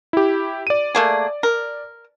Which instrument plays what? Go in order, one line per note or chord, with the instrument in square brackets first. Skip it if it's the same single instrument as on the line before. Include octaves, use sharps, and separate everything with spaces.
[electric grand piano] E4 G4
D5 D#7
[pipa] A3 A#3 G#4
A#4